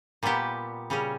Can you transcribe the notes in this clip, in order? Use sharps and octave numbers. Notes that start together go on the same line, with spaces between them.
A#2 G3 B3 G4
C#3 G3 C#4